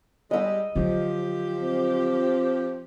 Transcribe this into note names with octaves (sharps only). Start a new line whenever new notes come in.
G3 G#3 D#5 E6
D3 F3 F#3 G4
C4